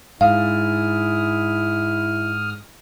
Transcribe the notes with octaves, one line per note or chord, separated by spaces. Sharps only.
G#2 E4 F5 D#6 F6